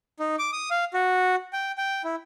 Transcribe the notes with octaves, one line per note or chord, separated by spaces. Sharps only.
D#4
D6
D#6
F5
F#4
G5
G5
E4